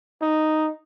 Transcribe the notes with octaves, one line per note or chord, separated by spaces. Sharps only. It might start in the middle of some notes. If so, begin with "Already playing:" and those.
D#4